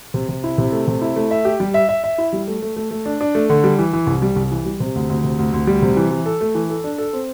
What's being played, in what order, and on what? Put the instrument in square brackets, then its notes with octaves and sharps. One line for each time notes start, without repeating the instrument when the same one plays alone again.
[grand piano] C3
C3
E4
C3
A3
C3
E4
A3
E5
G4
G3
E5
E5
E5
E4
G3
A3
A3
A3
A3
D4
D4
A3
D3
G3
E3
E3
C2
G3
C2
E3
G3
C3
D2
D2
C3
D2
D2
G3
C3
E3
E3
A4
A3
E3
A4
D4
A4
C4